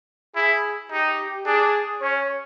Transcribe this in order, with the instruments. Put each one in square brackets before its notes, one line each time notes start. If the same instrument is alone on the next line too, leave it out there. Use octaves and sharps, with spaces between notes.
[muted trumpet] E4 [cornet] G#4
[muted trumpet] D#4 [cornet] G4
[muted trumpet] D4 [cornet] G#4
[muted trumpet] C#4 [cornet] C#5